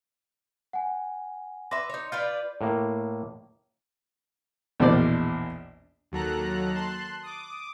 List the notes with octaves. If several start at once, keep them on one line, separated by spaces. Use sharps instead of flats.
F#5 G#5
B4 E5 C6 D6 A#6
D#4 C#5
F4 B4 D5 G6
A2 A#3
A#1 E2 B2 C5 D5
D#2 F#3 A4 A#5 F#6
A5 C6 F#6
D6 D#6